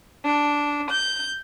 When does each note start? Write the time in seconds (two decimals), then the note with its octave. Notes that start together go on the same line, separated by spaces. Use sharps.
0.24 D4
0.90 G6